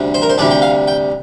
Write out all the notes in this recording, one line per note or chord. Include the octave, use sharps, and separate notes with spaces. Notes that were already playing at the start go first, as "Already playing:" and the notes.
Already playing: D2 C3 G3 D4
C5
A#4
C5
D2 C3 G3 D4 D5
G5
F5
G5